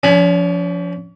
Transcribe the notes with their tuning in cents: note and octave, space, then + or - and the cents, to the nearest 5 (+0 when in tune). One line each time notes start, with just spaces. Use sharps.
F3 +0 C#4 +45 G#5 +0